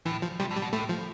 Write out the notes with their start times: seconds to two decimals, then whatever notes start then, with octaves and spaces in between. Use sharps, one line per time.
0.06 A2 E3
0.22 F3
0.40 C3 G3
0.51 A2
0.56 G3
0.62 B2
0.73 A2 A3
0.89 F3